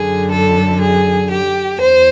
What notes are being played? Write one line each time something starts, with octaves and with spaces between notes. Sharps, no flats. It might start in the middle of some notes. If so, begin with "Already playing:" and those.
Already playing: F#2 D3 G#4
A4
G#4
G4
E2 C5